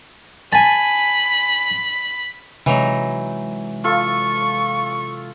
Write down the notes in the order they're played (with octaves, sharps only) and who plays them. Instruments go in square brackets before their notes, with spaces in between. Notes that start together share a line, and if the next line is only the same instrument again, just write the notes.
[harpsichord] G#5 A5 [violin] B5
[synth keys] C3 G#3 [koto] E3 F#3 D#4
[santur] F4 A4 [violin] C#6